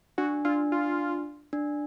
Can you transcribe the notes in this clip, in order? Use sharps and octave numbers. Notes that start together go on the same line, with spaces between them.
D4 F#4
D4 F4
F4
D4